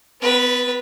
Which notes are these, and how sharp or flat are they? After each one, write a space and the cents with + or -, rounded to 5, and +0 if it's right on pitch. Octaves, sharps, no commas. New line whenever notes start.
B3 +25 B4 -15